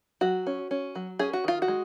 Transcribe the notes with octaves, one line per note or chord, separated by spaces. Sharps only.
F#3 F#4
C#4
C#4
F#3
C#4 G#4
F#4
D#3 F4
F#4
G#3